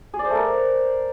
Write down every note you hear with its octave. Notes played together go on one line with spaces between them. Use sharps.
G#4
D5
C5
A3
A#4